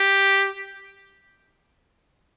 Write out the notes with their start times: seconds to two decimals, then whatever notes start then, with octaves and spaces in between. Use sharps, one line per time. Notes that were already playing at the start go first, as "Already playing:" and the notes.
Already playing: G4